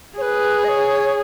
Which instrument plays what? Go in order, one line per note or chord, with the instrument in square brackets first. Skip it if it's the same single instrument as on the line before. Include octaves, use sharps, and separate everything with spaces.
[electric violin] G#4 [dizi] B4 C#5
[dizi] D#5
C#5